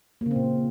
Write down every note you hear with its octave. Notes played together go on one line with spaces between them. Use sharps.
A#2 C#3 A#3 C4